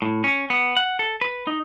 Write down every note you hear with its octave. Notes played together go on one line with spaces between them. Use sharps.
A2
C#4
B3
F#5
A4
B4
D#4